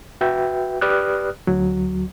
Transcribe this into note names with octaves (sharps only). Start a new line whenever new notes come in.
F#4 B4 E5 G5
G4 B4 D5 D#6 F6 F#6
D2 F#3